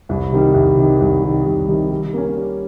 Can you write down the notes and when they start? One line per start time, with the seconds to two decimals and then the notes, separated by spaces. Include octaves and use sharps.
0.09 C2
0.32 C3 D#3 G3
0.54 C2
0.77 C3 D#3 G3
1.00 C2
1.23 C3 D#3 G3
1.46 C2
1.68 C3 D#3 G3
1.91 G3
2.13 A#3 C#4
2.37 G3